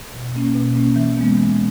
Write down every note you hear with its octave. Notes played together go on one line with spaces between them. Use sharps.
B2
A#3 C#4
B2
A#3 C#4
E3
G#3 B3
E3